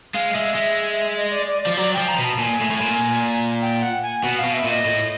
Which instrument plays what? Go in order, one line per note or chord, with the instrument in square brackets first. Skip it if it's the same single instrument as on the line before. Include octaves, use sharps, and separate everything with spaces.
[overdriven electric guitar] G#3 [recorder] F5
[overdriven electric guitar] G#3 [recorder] E5
[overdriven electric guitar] G#3
[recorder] D#5
D5
D5
[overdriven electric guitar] F3 [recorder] D5
[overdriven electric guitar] F#3 [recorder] D5
[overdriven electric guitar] F3 [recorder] G5
[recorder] A#5
[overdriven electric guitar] B2
[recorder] A5
[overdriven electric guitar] A#2 [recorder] G#5
[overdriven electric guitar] A2
A2
A#2
[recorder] G5
F#5
G#5
[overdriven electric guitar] B2 [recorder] F#5
[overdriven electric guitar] B2 [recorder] F5
[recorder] E5
[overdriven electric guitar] A#2
[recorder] D#5
[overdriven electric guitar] A2